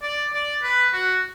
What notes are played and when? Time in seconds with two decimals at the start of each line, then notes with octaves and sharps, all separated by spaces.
0.02 D5
0.33 D5
0.63 B4
0.93 F#4